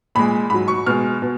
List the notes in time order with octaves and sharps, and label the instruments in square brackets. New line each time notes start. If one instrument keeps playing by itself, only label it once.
[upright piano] A#2 G#3 B5
G#2 F#3 B5
C#6
B2 G#3 F6
B2